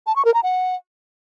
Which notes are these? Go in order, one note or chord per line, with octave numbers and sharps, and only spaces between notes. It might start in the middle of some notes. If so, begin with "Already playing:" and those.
A5
C#6
A#4
A#5
F#5